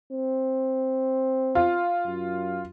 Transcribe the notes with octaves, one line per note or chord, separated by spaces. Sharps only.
C4
F4
F#2